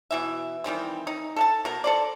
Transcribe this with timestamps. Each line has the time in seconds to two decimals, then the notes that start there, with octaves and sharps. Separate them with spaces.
0.11 B2 E3 E5
0.64 D#3 E3 G3 C4
1.07 D#4
1.36 A4 F5 A5
1.65 B2 A#4
1.84 A4 C5 D5